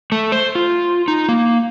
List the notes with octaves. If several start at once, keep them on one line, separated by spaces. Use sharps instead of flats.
A3
C5
F4
D#4
A#3